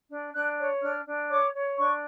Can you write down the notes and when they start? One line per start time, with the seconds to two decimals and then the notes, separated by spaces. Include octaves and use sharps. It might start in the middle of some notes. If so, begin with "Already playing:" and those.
0.11 D4
0.34 D4 F#6
0.59 C#5
0.82 D4 F6
1.05 D4
1.29 C#5 D6
1.53 C#5
1.76 D4 C#6